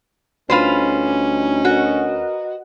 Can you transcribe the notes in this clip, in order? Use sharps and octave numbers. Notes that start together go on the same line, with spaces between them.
D2 G3 A3 C#4 D#4 F4 B4 C5
F#4 A#4 B4 D#5